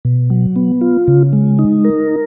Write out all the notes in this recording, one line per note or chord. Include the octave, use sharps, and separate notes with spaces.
B2
F#3
B3
F4
C#3
G#3
D#4
A#4